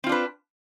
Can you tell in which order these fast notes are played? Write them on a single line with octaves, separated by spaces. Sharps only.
C4 F4 D4 B4